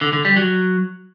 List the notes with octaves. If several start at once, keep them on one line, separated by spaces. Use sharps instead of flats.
D3
D3
G3
F#3